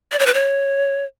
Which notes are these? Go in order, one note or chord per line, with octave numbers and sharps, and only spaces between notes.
D5
C#5
B4
C#5